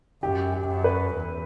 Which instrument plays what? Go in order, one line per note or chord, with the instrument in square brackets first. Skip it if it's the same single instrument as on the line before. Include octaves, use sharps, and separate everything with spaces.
[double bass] F#2 [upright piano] G4
[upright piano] G4
[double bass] F#2
[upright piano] B4
[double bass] E2